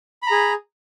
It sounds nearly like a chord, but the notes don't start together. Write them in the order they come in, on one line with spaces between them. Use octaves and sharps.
B5 A#5 G#4